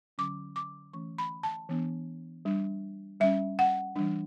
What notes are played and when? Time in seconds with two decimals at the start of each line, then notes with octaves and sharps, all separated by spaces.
0.18 D3 F#3 C#4 D6
0.56 D6
0.93 E3 A3 C#4 C#6
1.18 B5
1.43 A5
1.69 E3 B3 D4
2.45 G3 D4
3.20 G3 C#4 E5
3.59 F#5
3.96 E3 G3 D4